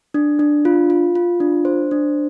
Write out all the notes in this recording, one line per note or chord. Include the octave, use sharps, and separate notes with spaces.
D4
D4
F4
F4
F4
D4
C5
D4